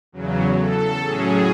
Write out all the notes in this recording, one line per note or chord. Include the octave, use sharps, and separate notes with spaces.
E2 C#3 F#3
A4
A2 F#3 C#4 G#4